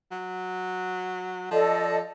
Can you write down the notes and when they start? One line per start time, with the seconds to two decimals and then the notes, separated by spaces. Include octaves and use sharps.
0.12 F#3
1.51 F3 A4 D5 D#5